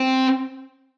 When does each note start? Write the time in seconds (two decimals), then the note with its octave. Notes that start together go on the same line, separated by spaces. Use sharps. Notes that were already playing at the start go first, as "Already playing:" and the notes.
Already playing: C4